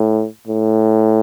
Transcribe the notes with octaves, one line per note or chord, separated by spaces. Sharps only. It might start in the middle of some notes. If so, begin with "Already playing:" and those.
Already playing: A2
A2